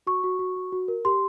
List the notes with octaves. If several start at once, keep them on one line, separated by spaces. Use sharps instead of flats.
F#4 C#6
F#4
F#4
F#4
F#4
A#4
G4 C6